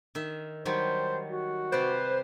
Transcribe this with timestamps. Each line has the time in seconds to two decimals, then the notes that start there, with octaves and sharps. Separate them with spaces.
0.15 D#3 E5
0.65 D#3 F#3 G3 C5
1.27 F#4
1.72 C3 B4 C5 D5